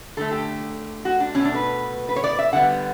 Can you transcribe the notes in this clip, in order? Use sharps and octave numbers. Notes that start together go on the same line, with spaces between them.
D3 A3 A4
G4
F#4
D4
B2 A3 C#4
D4
B4
B4
C#5
D5
E5
D3 G3 B3 F#5